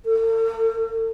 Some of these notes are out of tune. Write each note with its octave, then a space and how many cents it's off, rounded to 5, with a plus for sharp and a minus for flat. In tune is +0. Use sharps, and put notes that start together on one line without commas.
A4 +45